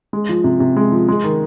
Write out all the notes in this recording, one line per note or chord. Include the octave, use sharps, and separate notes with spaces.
G#3
F3
C3
C3
G#3
F3
G#3
D#3